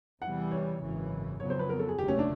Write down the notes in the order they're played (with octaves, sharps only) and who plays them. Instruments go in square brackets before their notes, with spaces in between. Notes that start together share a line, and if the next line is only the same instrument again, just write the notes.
[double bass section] E2 C3 E3 G3 [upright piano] F#5
[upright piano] C#5
[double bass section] G#1 F#2 C#3 E3
[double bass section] F2 C#3 F#3 B3 [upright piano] C#5
[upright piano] C5
B4
A#4
A4
G#4
[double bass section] F1 D#2 D3 F#3 A3 [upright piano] G4
[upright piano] C#4
D4